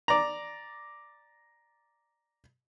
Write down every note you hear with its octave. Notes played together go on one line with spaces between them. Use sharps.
D5 A#5